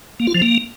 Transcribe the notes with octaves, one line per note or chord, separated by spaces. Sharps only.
A#3
F4
F3
A#3